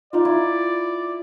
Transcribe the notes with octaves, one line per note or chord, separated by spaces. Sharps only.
D#4 F4 D5
E4